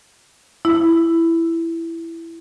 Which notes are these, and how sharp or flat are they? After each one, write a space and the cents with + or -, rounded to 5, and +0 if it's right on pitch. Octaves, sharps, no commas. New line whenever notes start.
E4 +10